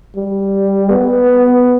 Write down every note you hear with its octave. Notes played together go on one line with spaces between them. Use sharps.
G3
B3